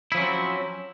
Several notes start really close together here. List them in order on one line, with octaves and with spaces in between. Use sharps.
E4 F3 C#4 F#3 C4